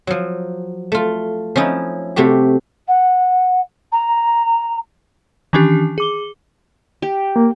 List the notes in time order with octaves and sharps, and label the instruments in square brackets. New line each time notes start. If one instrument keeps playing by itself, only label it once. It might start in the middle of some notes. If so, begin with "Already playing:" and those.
[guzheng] F3 F#3
A3 F4
F3 C#4 D#4 E4
C3 A3 F#4 G4
[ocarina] F#5
A#5
[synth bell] D#3 E3 C#4 D4 G4
G#4 D6 G7
[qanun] G4
[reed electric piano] A#3